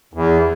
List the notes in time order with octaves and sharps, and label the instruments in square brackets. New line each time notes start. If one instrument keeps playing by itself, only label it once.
[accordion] E2